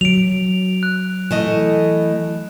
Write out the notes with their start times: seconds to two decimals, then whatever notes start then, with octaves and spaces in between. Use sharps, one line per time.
0.01 F#3 D7 F7
0.83 F#6
1.31 E3 A3 D#5 E7